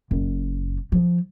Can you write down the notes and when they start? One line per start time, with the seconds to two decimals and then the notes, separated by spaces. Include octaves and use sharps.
0.11 F#1
0.92 F3